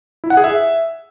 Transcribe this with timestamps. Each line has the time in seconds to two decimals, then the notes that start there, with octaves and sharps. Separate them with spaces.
0.24 E4
0.30 F#5
0.37 G#4
0.44 E5